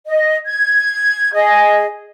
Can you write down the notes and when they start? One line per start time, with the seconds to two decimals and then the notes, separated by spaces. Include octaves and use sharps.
0.06 D#5
0.46 G#6
1.32 G#4 D#5